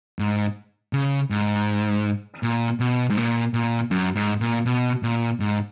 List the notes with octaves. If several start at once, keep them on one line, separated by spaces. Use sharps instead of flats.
G#2
C#3
G#2
A#2
B2
G#2
A#2
A#2
F#2
G#2
A#2
B2
A#2
G#2